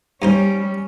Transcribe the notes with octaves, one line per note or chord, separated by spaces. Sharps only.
G2 G3 C#4 D#4 C5